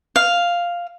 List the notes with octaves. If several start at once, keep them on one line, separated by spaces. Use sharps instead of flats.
F5